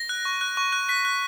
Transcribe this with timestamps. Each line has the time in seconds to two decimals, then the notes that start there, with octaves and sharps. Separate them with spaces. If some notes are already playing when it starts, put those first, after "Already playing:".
Already playing: A#6
0.09 F#6
0.25 C#6
0.41 F#6
0.57 C#6
0.72 F#6
0.89 F#6 B6
1.05 F#6